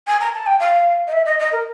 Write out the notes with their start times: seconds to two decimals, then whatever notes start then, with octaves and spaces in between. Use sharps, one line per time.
0.07 G#5
0.20 A#5
0.34 A5
0.46 G5
0.60 F5
1.07 D#5
1.12 E5
1.26 D#5
1.39 D#5
1.52 A#4